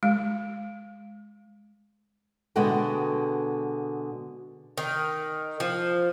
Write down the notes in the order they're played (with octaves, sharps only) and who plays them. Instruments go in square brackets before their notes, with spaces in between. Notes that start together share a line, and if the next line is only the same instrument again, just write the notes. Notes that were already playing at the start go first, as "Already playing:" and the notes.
[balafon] G#3
[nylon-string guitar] B2 D3 G#3 B3 F#5 G5
[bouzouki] D#3
F3